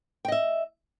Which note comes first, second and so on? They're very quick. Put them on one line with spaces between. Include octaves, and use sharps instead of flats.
G5 D#5 E5